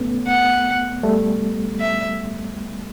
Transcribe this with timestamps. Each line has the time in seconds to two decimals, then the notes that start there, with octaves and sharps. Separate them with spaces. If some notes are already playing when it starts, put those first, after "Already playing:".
Already playing: A3 B3 C#4
0.27 F#5
1.03 G3 A3
1.80 E5